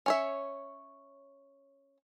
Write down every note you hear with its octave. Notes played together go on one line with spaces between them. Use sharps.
C#4 C#5 E5